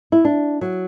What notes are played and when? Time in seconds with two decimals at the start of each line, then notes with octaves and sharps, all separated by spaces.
0.12 E4
0.25 D4
0.61 F#3